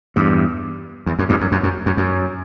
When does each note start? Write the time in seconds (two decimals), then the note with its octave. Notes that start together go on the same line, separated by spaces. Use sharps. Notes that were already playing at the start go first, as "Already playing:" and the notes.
0.16 E2 G2
1.06 E2
1.19 F#2
1.29 E2 G2
1.41 F#2
1.52 F#2
1.63 F#2
1.86 F#2
1.97 F#2